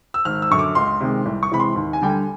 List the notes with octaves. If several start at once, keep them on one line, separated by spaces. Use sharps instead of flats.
E6
G#1 F6
E6
F#2 D3 C#6
D6
C#2 C6
C3 D#3 G#3
C2
C#6
C3 E3 G#3 B5
C6
D#2
G#5
D3 G3 G5
G#5